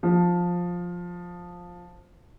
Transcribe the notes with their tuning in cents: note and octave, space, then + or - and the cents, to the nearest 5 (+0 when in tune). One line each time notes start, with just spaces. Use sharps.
F3 +10